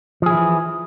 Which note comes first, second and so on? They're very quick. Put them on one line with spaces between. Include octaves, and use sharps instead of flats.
F3 G#4 E4 E3